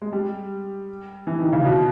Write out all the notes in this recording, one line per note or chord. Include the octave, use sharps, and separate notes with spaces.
G#3
G3
E3
D#3
C#3
B2